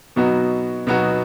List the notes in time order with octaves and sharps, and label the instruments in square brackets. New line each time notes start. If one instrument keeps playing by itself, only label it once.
[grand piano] B2 F#3 B3 D#4 F#4
B2 F#3 B3 D#4 F#4